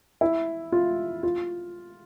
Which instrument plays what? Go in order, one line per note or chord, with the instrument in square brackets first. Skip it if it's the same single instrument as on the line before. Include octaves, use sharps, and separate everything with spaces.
[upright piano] E4
F4
F4